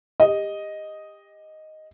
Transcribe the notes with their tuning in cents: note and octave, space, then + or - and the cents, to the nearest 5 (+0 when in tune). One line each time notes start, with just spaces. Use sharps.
G4 +30 D#5 +0